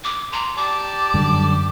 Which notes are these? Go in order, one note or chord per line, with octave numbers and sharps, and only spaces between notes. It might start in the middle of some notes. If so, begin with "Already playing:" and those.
D6
A#5 C6
G4 D5 A5 D6
F#2 D3 G3